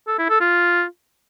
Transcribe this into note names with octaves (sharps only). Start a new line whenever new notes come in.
A4
E4
A4
F4